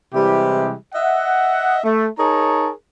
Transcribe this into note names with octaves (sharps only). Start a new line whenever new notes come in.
C3 E3 G3 G#3 E4 G4
D#5 E5 F#5
A3
D#4 G#4 A#4 C#5 A5 A#5